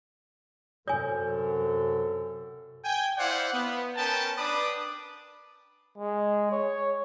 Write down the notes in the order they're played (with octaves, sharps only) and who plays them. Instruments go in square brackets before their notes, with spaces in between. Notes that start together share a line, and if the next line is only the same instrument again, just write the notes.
[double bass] F#2 C3 [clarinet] A4 [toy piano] C#5 G#5
[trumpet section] G5 G#5
E4 C5 D5 F5 F#5
B3
C#4 A#4 B4 G5 A5
D4 B4 D5 B5 D6 D#6
[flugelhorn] G#3
C#5